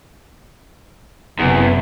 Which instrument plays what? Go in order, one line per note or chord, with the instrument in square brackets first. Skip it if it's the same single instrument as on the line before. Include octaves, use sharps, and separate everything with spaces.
[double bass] F#1 C3 [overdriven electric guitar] E2